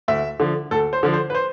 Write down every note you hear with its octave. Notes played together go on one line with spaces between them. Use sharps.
D2 E5
D3 F3
D2 A4
C5
D3 F3
C5
B4
C5